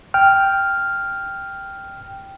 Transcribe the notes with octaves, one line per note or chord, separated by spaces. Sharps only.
G5 F6